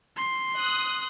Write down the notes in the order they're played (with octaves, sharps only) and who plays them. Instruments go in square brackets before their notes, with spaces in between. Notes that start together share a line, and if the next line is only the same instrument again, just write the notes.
[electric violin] C6
[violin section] D#6 F#6